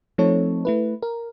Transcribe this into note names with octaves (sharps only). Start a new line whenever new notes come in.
F3 A3 C4 D#4 A4 C#5
A3 E4 B4
A#4